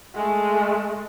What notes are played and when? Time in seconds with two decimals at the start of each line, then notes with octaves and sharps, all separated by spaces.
0.15 G#3 A3